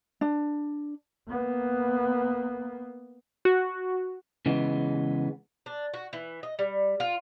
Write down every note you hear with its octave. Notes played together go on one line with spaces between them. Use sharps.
D4
A#3 B3
F#4
C#3 E3 G#3 B3
D4
F#4
E3
D#5
G3
F4